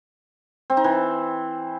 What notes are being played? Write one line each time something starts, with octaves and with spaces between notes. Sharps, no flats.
C4
D#4
E3